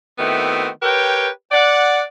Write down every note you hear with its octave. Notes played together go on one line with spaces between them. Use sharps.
D#3 A3 B3 C4 E4 F#4
G4 A#4 B4 C#5 G5
D5 F#5